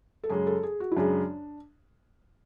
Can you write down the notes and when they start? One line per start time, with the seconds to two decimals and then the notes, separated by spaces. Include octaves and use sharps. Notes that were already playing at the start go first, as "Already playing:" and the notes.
0.24 A4
0.29 F#2 C#3 G#3 G#4
0.47 A4
0.63 G#4
0.80 F#4
0.92 E4
0.97 F#2 C#3 G#3 D4